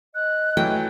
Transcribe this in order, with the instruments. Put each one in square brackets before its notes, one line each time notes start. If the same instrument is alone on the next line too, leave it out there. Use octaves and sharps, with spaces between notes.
[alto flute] D#5 [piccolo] F#6
[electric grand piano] E3 F#3 A3 [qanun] G5